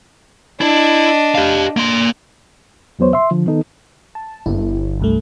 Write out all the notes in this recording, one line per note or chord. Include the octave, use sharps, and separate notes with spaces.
D4 E4 D#5
G4 F5
A#3 C6
E2 F#3 B3 C5 C#5
E5 C6
D3 F3
D#3 B3 D#4 A4
A5
G1 E4
C2 G2 A3